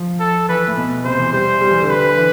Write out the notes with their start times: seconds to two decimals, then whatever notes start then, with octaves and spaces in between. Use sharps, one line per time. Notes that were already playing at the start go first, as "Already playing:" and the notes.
Already playing: F3
0.20 A4
0.49 E3 B4
0.68 A2
0.77 B2
1.05 C3 C5
1.19 E3
1.33 G3 C5
1.61 G3
1.71 E3
1.80 D3
1.89 B4
2.18 E3